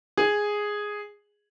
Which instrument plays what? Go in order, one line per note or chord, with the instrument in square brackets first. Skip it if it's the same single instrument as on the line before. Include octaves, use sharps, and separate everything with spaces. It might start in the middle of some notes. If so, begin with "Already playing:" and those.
[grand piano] G#4